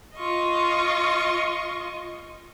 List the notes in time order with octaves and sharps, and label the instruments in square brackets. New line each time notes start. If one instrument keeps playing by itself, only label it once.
[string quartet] F4 D#5 C#6